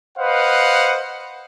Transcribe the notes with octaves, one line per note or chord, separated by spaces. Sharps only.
B4 C5 D#5 F5 F#5